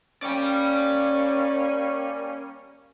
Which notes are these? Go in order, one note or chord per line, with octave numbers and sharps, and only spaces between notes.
G3 A#3 C#4 D5 G5